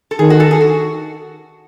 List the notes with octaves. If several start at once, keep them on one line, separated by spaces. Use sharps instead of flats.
A4
D#3 G#4
F#4
A4
G#4
F#4